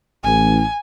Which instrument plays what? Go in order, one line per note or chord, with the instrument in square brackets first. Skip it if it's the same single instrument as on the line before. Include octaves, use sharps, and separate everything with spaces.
[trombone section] A1 [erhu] G#5